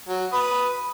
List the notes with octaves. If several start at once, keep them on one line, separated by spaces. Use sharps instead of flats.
F#3
B4 D#6